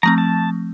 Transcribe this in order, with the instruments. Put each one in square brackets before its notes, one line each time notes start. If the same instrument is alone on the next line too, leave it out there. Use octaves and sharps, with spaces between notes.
[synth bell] F3 A3 C4 [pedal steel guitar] A#5
[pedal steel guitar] A5